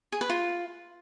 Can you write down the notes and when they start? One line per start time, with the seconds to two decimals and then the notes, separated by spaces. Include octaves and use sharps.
0.12 G#4
0.21 B4
0.30 F4